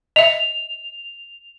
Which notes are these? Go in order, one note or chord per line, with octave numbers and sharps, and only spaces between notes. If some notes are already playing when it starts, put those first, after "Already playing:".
D#5 E5 F7